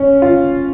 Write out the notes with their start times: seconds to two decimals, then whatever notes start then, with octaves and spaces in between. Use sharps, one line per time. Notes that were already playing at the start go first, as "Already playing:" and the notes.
Already playing: C#4
0.22 F4